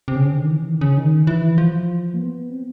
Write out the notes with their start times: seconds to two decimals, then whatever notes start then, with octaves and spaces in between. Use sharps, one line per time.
0.08 C3
0.16 C#3
0.25 D3
0.36 D#3
0.51 E3
0.67 D#3
0.75 D3
0.81 C#3
0.97 D#3
1.27 E3
1.58 F3
2.14 A#3
2.19 B3
2.49 C4